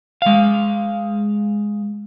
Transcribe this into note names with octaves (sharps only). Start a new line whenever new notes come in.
G#3 F5